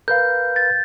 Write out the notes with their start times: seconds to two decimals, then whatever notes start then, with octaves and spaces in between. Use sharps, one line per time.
0.08 A#4 B4 F5 G6
0.56 A6